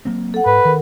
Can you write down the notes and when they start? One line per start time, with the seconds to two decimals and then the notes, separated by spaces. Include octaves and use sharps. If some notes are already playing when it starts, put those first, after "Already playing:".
0.05 F#3 A#3 C4
0.34 A4 F#5
0.46 G#2 B4
0.65 D#3 A#4